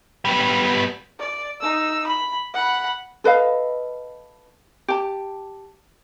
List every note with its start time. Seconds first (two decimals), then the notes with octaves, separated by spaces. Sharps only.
0.25 G3 B3
1.19 D5
1.61 D#4 E6
2.07 B5
2.54 F#5 B5
3.24 A4 B4 D#5 F5
4.88 G4 A5